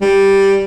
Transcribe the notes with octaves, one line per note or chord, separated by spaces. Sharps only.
G3